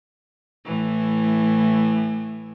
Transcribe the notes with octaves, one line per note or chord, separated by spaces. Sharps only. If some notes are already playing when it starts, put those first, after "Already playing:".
A2 E3